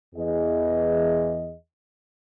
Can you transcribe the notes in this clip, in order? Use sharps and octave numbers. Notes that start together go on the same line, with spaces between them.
E2 E3 G#4 D#5